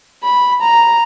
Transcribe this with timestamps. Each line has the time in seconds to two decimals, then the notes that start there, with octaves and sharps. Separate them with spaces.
0.24 B5
0.62 A#5